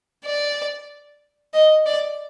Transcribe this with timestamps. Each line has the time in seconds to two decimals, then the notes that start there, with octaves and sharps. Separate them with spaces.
0.25 D5
1.54 D#5
1.86 D5